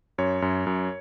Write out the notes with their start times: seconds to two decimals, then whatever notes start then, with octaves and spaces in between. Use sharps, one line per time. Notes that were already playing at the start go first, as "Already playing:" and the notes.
0.18 F#2 C#5
0.42 F#2
0.67 F#2